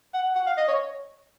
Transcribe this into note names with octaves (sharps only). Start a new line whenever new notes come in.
F#5
F#5
F5
D#5
C#5